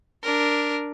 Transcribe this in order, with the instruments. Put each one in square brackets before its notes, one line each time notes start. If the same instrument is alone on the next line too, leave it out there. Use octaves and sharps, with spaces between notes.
[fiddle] D4 A#4